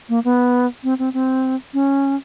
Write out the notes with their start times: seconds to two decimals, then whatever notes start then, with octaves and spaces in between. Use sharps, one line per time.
0.09 A#3
0.24 B3
0.83 C4
0.99 C4
1.13 C4
1.73 C#4